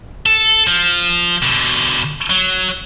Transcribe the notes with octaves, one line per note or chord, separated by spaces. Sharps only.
A4
F3
B2 D3
F#3